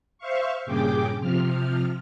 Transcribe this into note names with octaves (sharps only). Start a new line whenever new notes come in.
C5 E5 F5 C#6
G2 A#2 C#3 G#4 G5 D6
C3 F3 F6